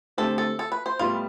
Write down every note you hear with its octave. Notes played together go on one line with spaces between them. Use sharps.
D3 A3 C4 G4 A4 C5
A4
A4
B4
C5
A2 G3 B3 F4